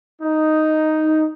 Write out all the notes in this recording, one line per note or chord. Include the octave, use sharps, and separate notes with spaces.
D#4